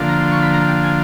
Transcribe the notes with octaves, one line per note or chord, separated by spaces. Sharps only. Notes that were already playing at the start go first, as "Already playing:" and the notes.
Already playing: D3 F3 A#3 D4 F4
A#5
C6
C#6
B5
A#5
G5
G#5